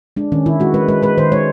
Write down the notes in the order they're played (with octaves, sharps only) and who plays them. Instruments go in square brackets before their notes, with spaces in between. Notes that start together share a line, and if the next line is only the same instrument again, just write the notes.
[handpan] G#3 D4
D#3 C#4
D#3 E4
G#3 F#4
G#3 B4
G#3 B4
G#3 B4
D#3 C5
G#3 C#5